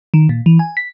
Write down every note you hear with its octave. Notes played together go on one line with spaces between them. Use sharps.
D#3
A#2
E3
G#5
B6